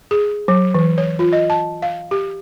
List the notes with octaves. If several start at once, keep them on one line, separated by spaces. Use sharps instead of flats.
G#4
F#3
E3
C#5
F4
D#5
A5
F5
G4